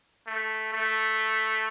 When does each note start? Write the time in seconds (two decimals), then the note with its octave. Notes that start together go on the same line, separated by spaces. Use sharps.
0.27 A3
0.73 A3